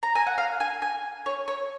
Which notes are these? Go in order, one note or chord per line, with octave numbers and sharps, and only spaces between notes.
A#5
G#5
F#5
F5
G#5
G#5
C#5
C#5